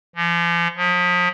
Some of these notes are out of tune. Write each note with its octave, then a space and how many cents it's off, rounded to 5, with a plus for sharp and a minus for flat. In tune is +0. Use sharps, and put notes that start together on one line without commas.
F3 -40
F3 +35